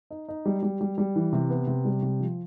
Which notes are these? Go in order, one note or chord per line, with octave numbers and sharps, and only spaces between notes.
D#4
D#4
G3
G3
G3
G3
E3
C3
B3
C3
G3
C3
F3